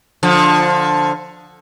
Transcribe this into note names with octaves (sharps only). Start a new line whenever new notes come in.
D3 F3